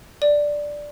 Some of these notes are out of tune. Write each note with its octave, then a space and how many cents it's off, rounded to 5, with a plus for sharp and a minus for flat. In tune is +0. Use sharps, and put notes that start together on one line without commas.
D5 +0